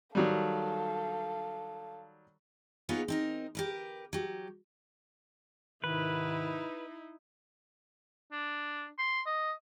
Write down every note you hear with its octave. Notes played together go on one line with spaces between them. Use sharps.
D#3 F#3 G3 A4 F5
B3 D#4 F4 G#4 B4 C#5
C4 D#4 A#4
G4 A#4 B4
F#3 G4
G#2 C3 D#3 D#4 E4 B4
D4
C6
D#5